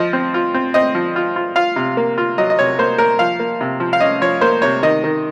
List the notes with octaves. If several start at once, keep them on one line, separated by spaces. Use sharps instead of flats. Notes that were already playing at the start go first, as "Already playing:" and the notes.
Already playing: F3 D#5
C4
F4
C4
C4 D#5
F3
F4
F4
F4 F5
C3
A#3
F4
F#3 D#5
D#5
C3 C#5
A#3 C5
A#3 A#4
F3 F5
A#3
C3
F3
F5
C#4 D#5
F3 C#5
A#3 C5
C3 C#5
D#3 D#5
D#3